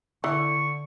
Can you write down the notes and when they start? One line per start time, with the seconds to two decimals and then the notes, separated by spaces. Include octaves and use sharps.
0.24 D3 E3 C#6